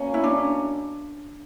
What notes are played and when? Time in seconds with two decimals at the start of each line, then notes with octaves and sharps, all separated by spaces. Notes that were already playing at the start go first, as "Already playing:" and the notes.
Already playing: B2 A#3 C#4
0.14 E4
0.24 D4